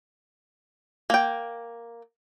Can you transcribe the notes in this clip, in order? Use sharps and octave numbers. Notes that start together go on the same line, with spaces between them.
A#3 G5